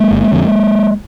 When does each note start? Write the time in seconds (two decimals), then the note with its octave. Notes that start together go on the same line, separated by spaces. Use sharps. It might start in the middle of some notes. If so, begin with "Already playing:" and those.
Already playing: G#3 A#3
0.11 G1
0.32 F2 D3